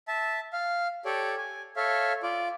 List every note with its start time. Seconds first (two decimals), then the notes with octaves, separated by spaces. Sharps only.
0.08 E5 A5
0.53 F5
1.05 G4 A4 C#5 D5
1.37 G#5
1.76 A4 C#5 E5 F5
2.23 F4 D5